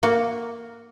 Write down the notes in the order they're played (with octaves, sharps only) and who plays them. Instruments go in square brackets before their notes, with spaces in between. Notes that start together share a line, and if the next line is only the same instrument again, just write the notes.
[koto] A#3 F#4